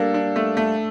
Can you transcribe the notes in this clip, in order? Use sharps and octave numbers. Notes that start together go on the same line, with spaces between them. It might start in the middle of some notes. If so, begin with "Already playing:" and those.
Already playing: G3 A#3 D4 A4
D4
A3
A3